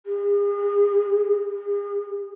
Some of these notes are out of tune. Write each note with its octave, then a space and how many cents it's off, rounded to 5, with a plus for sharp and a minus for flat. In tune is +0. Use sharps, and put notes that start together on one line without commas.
G#4 -40
G#4 -45